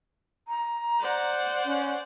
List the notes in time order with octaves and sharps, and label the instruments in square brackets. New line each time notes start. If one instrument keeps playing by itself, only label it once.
[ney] A#5
[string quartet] C5 D5 F#5
[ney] C#4